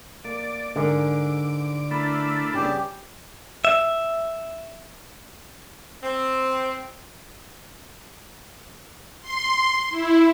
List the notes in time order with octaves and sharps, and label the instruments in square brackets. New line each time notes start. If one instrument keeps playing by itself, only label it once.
[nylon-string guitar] A#3 [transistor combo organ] D5
[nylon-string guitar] G#2 A#4 [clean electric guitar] D3 [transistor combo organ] D6
[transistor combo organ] A3 D4 E4 [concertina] A#4 B5
[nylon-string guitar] C#3 G3 B3 [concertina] G4
[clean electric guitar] E5
[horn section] C4
[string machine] C6
E4